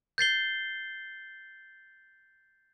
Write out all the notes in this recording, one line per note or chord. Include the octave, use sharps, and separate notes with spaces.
G6 A6 C7 G7